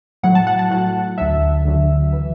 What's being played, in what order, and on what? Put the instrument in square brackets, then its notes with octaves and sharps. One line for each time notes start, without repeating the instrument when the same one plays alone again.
[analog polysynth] A2 F#3 F#5
A5
F#5
A5
A2 F#3 F#5
D2 D3 F#3 E5
D2 D3 F#3
E3